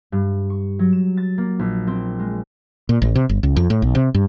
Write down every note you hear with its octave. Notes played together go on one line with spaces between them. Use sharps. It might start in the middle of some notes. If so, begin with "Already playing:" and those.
G2
C#6
F#3
E7
A6
A#3
A#1
C4
G#3
A#2
A1
C3
G1
C#2
F2
A2
B1
C3
G2